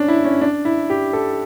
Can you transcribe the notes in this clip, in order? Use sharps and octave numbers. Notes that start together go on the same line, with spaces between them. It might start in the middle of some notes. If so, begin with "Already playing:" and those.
Already playing: C#4 D4
E4
C#4
D4
E4
G4
A4